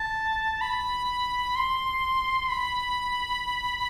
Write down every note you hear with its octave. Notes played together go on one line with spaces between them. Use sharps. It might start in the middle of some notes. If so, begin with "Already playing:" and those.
Already playing: A5
B5
C6
B5